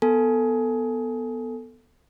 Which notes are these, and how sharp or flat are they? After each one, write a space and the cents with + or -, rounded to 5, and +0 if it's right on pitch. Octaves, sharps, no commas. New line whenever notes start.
B3 +0 A4 +10 G#5 +15